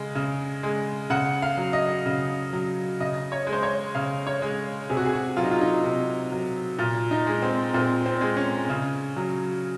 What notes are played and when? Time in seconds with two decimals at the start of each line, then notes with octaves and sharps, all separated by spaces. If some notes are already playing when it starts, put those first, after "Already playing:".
Already playing: C#3 G#3
0.15 C#3
0.63 G#3
1.10 C#3 F#5
1.42 F5
1.57 F#3
1.73 D#5
2.06 C#3
2.53 F#3
3.00 C#3 D#5
3.32 C#5
3.47 G#3
3.53 C5
3.63 C#5
3.95 C#3 F5
4.27 C#5
4.42 G#3
4.89 C3 G#4
4.97 F#4
5.05 G#4
5.13 F#4
5.37 F#3 F4
5.44 D#4
5.51 F4
5.61 D#4
5.84 C3
6.32 F#3
6.79 A#2
7.11 D#4
7.27 G#3
7.42 C4
7.74 A#2 C4
8.06 C4
8.21 G#3
8.37 C#4
8.69 C#3
9.16 F#3